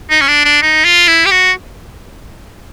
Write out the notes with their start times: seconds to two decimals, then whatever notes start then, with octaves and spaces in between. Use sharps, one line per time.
0.10 D#4
0.21 C#4
0.28 D4
0.45 D4
0.62 D#4
0.85 F4
1.07 E4
1.26 G4
1.31 F#4